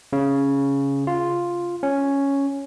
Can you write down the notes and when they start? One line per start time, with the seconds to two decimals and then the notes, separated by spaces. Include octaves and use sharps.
0.13 C#3
1.07 F4
1.83 C#4